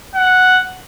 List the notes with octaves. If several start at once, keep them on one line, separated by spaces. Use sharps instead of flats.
F#5